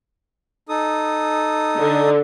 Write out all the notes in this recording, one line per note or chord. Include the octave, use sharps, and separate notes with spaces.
D#4 A4 D#6
D3